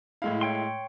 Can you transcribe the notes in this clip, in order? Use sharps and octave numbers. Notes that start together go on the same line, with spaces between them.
A2 G#3 E4 F5
C#5 G5 C6